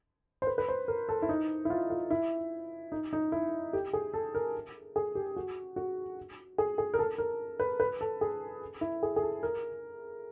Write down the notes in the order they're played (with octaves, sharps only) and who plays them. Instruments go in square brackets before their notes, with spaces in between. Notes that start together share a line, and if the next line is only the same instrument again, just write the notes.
[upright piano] C5
B4
B4
C5
A#4
A4
E4
D#4
E4
F4
F4
E4
D#4
D#4
E4
G4
G#4
A4
A#4
G#4
G4
F#4
F#4
G#4
G#4
A#4
A4
A#4
B4
B4
A4
G#4
E4
G#4
G#4
A4
A#4